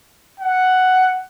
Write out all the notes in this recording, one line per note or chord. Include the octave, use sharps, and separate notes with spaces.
F#5